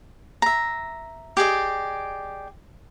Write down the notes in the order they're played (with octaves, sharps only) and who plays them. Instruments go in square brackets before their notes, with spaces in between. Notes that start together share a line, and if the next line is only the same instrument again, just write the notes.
[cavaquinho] E5 A#5
G4 G#4 D5 D#5